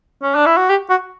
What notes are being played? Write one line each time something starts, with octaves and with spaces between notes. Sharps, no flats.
C#4
D4
E4
F#4
G4
F#4